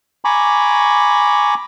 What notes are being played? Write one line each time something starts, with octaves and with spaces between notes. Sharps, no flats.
G#5 A#5 B5 C#6 D6